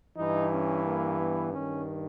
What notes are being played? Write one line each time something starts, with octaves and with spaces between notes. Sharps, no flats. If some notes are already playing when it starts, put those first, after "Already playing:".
G2 E3 D#4
C#4
A#3
B3
G2 D#3 C#4